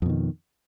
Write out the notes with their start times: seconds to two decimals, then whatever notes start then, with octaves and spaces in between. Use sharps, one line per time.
0.02 F2
0.06 B2
0.09 D#3